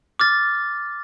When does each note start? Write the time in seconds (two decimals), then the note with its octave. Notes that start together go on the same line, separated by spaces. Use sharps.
0.20 D6 F6 A6